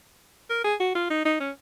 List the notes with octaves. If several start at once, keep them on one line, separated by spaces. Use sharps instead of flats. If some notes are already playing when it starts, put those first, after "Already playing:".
A#4
G#4
F#4
F4
D#4
D#4
C#4